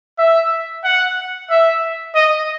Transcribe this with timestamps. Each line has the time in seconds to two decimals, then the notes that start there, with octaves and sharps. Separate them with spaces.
0.18 E5
0.84 F#5
1.50 E5
2.15 D#5